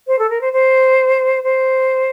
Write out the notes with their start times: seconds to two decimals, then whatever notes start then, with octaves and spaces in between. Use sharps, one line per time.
0.07 C5
0.19 A4
0.30 A#4
0.41 C5
0.53 C5
1.44 C5